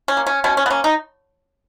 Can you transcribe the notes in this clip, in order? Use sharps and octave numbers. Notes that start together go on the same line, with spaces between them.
C#4
A#3
C#4
B2 C#4
C#4
B3
A#3 C#4
D#4